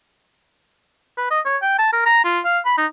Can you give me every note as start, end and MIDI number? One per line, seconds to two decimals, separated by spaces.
1.18 1.30 71
1.31 1.40 75
1.46 1.58 73
1.62 1.76 79
1.79 1.88 81
1.93 2.04 70
2.06 2.25 82
2.25 2.40 65
2.45 2.59 77
2.65 2.73 83
2.78 2.86 63